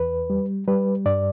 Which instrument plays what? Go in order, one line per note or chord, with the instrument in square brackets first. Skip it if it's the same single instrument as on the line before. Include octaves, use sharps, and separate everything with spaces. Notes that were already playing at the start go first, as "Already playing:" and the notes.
Already playing: [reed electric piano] E2 B4
G3
G3 B4
G2 D5